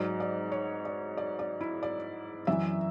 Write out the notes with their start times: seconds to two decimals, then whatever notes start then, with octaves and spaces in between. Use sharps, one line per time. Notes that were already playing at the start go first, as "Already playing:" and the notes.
Already playing: G#2 F#3 D5
0.20 D5
0.52 C#5
0.85 D5
1.17 D5
1.39 D5
1.61 E4
1.83 D5
2.47 F#2 E3 E5